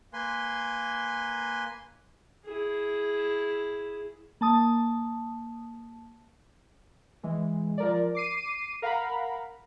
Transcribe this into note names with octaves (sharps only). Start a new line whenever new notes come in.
A#3 B4 G#5 C6
E4 G#4
A#3 A5 D#6
E3 G#3
F3 A#4 D5
D6 C7 D#7
A#4 F5 F#5 A#5 B5